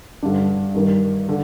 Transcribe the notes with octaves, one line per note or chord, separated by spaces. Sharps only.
G2 D3 G3 D4
G2 D#3 G3
D3